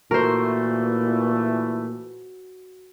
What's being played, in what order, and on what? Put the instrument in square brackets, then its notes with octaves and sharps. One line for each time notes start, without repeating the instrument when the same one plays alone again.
[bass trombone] A#2 [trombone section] E3 A3 [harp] F#4 C5 [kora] A#4